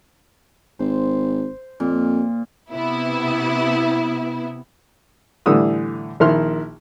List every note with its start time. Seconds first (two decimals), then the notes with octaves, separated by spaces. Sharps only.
0.79 G#1 C5
1.80 F2 A#2
2.72 C3 B3 E4
5.46 A2 D3 E3 G3 D#6 E6
6.20 A#1 D#3 E4 C6 F6